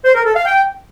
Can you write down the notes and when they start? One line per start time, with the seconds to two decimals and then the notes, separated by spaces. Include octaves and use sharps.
0.05 C5
0.15 A#4
0.25 A4
0.35 F5
0.45 G5